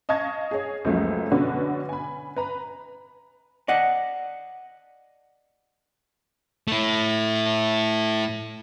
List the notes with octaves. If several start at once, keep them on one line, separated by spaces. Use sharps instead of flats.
D#5 F5 A5 C#6 G#6 A#6
G#4 C#5
C#2 F#2 F3 F#3 A3 A#3
B2 D3 C#4 D4 F#4 B4
G#5 B5
B4 A#5 B5
D5 D#5 F#5
A3 E4